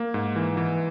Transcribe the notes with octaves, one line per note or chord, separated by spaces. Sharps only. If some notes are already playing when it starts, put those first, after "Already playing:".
Already playing: A#3
G#2
E3
E3